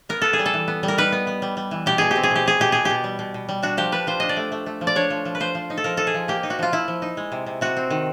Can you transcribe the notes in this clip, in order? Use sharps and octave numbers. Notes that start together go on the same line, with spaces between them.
B3 A#4
B3 A4
G#4
G3
A4
E3
B3
G3
A#4
D#4 B4
B3
B3
G3
G3
E3
B2 G4
B2 G#4
C4 G4
G#4
B2 G4
B2 G#4
B2 G4
B2 G#4
B2 G4
G3
B2
B2
G3
D4 F#4
F3 G4
D4 B4
F3 C5
D4 D#5
D5
A3
A3
A3
F3
D5
D4 C#5
F3
F3
B4
F3 C5
F3
D#4
A4
F3 A#4
D#4 A4
G#4
F3
A#3 G4
D#4
F#4
F3 F4
F3 E4
F3
D#4
G#3
C3
C3
C3 F#4
C4
D#3